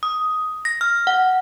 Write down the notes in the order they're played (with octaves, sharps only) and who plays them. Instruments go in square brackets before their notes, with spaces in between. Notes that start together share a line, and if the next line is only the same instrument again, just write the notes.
[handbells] D#6
A#6
F6
F#5